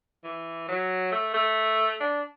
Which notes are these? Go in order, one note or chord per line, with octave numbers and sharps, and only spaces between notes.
E3
F#3
A3
A3
D4